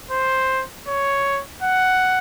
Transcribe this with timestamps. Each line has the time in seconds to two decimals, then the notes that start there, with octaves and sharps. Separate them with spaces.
0.11 C5
0.87 C#5
1.63 F#5